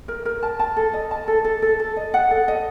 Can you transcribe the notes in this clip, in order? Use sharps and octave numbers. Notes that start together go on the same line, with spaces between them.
A#4
A#4
A5
A5
A4
D#5
A5
A4
A4
A4
A4
D#5
F#5
A4
D#5